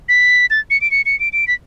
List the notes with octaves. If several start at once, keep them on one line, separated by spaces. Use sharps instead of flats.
B6
A6
C#7
D7
C#7
C#7
D7
D7
B6